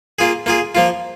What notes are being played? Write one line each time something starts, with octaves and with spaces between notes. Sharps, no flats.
A#3 F4 G#4
A#3 F4 G#4
F3 A#3 F4